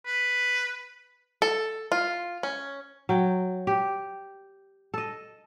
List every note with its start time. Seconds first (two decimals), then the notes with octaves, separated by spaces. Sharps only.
0.06 B4
1.42 A4
1.92 F4
2.43 C#4
3.09 F#3 G5
3.67 G4
4.94 A4 D#5